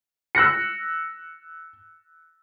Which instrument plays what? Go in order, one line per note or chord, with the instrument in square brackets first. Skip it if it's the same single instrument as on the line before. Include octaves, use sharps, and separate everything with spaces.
[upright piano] E6 F#6 A#6 C#7